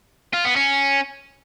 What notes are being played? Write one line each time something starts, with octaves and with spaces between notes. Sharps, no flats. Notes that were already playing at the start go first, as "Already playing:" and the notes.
F4
B3
C#4